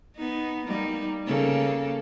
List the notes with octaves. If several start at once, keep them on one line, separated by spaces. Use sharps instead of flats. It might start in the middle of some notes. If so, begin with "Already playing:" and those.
B3 D#4
G3 A#3 D#4
C#3 A#3 A4